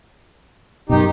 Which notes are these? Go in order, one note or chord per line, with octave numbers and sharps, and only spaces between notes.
F#2 B2 D#3 D#4 G4